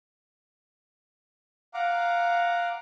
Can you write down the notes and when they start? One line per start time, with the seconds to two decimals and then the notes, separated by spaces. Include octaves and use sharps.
1.74 F5 F#5 A#5 D6